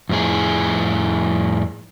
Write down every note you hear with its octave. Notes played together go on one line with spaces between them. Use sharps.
F2 A2 G#4